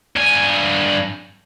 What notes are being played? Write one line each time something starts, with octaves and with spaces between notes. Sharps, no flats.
G2 G#5